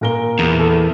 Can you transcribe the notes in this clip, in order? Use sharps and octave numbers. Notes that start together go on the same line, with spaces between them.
A#2 A#4 G7
E2
A4